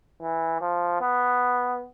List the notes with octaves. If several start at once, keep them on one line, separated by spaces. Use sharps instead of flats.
E3
F3
B3